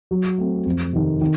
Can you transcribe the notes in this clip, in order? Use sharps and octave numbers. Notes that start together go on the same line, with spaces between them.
F#3
A3 C4
F2
C3 D#3
D#3